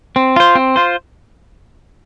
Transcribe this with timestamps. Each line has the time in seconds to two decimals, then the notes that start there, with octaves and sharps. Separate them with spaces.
0.16 C4
0.36 F4 C5
0.55 C4
0.76 F4 C5